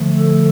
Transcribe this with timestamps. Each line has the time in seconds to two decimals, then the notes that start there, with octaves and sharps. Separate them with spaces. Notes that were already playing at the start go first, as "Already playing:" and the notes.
Already playing: D3 F3 A3
0.18 A4